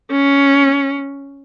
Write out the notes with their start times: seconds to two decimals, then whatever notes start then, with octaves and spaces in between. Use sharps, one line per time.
0.11 C#4